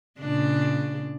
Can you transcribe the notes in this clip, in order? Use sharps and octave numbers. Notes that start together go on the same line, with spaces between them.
A#2 C#3 D4